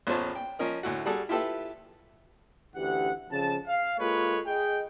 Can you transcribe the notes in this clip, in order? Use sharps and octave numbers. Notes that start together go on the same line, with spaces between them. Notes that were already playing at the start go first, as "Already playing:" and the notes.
A1 E2 F4 C5 C#5 A5
G5
F3 C#4 A#4 D#5
D2 A2 F#4
G3 F#4 G#4 A4
E4 F4 G4 A4 B4 E5
D2 E3 C#4 G4 F#5
F2 C#3 A5
F5
G#3 A#3 F4 A4 B4 C#5
G#4 D#5 G5